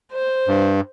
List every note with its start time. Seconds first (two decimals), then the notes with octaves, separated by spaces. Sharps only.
0.12 C5
0.48 G2